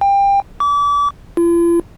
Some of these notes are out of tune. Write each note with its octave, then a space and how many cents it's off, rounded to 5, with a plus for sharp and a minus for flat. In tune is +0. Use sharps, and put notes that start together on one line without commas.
G5 +25
D6 -35
F4 -45